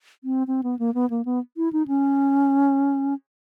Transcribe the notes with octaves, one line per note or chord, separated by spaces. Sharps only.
C4
C4
B3
A#3
B3
A#3
B3
E4
D#4
C#4